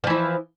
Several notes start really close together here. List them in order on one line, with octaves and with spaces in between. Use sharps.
F3 E3 E4